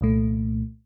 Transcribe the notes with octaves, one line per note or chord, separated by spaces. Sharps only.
C2 A#2 A3